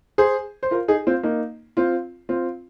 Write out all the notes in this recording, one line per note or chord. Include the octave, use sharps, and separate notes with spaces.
G#4 C5
C5
F4 A#4
D#4 G#4
C4 F4
A#3 D#4
C4 F4
C4 F4